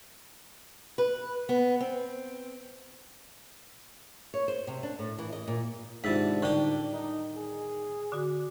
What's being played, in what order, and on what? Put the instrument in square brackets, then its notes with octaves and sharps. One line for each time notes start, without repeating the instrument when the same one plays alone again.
[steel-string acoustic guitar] B4
B3
C4
[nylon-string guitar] C#5
C5
C3
D4
A2
E3
D#5
A#2
[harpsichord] G#2 C3 [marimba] D#3 E4 [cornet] D4 [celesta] F4 A6 B6
[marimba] A2 D3 G3 [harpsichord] D#3 G4 [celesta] D5
[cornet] D#4
G#4
[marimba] D3 F#4 [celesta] D6 D#6